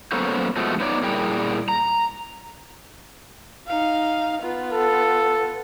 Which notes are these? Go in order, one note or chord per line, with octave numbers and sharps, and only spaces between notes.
F#3 A#3 B3 C#4 A4 C5
B2 F3 G#3 A3
B3 D#4 C#5 D5
A#2 G3 E4 G#4 A#4 G5
A#5
D#4 F5
B3 F4
A4